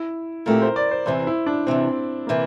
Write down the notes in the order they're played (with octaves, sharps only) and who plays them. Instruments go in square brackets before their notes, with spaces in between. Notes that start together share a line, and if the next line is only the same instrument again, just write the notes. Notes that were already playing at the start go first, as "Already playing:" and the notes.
Already playing: [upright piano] E4
[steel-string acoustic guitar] A#2 A3 C4 G4 [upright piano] A#4
[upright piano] C5
D5
C5
[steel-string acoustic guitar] E2 C3 E3 [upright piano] C5
[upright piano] E4
D4
[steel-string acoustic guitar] E2 C3 E3 [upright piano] C4
[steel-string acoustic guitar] C3 E3 [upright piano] A#3